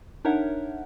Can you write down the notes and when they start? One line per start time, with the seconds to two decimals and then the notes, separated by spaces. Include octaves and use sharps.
0.25 D4 D#4 A#4 C#5 E5 F#5